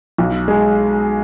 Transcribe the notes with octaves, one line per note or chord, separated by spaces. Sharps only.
B1
G#3